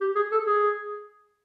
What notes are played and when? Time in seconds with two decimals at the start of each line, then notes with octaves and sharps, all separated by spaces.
0.01 G4
0.15 G#4
0.32 A4
0.47 G#4